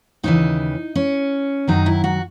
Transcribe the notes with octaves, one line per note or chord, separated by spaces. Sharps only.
D#2 C#3 E3 D#4
C#4
F#2 D#3 F#3 D#4
E4
F#4